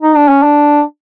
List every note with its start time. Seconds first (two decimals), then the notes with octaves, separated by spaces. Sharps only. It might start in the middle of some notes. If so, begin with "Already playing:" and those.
0.02 D#4
0.16 D4
0.29 C#4
0.43 D4